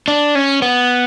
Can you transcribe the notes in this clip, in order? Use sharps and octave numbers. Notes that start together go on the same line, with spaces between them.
D4
C#4
B3